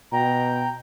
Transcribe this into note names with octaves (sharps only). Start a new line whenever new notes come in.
B2 G5 A#5